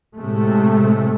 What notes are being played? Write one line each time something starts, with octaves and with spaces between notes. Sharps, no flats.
A2 C3 G#3 A3